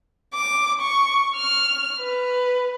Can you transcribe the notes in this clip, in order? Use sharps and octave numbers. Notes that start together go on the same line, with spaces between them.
D6
C#6
F6
B4